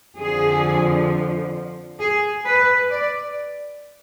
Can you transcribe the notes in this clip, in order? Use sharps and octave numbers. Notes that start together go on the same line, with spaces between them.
F2 D3 F3 G#4
G#4
B4
D5